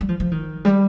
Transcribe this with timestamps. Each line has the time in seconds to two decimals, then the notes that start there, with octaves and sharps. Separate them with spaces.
0.01 G3
0.09 F3
0.20 F3
0.31 D#3
0.65 G3